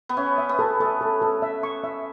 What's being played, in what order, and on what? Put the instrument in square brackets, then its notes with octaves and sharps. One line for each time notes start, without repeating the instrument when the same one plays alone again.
[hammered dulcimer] B3
[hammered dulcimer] C#4 [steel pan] E5
[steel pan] E5
[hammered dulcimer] B3
[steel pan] A4
[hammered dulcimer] A3 [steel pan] A4
[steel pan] A4
A4
E5
C#6
E5